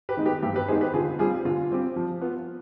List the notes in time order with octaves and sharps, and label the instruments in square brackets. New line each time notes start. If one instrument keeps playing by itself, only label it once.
[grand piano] G4 B4
[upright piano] D#3 G#3 B3 D#4
[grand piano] G4 B4
[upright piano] G2 [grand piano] G4
[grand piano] G4 B4
[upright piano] D#3 G#3 B3 D#4 [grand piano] G#4 C5
[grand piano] G4 B4
[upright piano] D3 [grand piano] F4 G#4
[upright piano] G3 C4 G4 [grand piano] F4 G#4
[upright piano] D3 [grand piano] F4
[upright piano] G3 C4 G4
F3
B3 F4